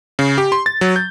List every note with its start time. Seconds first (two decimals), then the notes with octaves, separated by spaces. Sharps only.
0.19 C#3
0.38 G4
0.52 C6
0.66 A6
0.81 F#3
0.96 G6